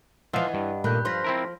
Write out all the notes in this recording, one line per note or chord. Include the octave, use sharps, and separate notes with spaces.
E3 F3 E4 D#5 F5 F#5
G2
A#2 D#3 A3 B5 F#6 G6
F3 F4 C6 A#6 B6
C4 E4 A#4